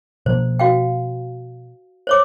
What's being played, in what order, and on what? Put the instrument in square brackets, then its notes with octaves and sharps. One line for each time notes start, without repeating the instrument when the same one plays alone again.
[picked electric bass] B2 F3 A#3 [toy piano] C5
[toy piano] F#4 F5 G5
C5 C#5 D6